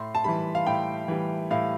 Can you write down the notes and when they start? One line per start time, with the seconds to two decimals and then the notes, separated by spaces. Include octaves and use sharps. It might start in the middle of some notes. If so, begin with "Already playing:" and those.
Already playing: A2 C6
0.15 A5
0.24 E3 G3 B5
0.55 F5
0.67 A2 G5
1.08 E3 G3
1.51 A2 F5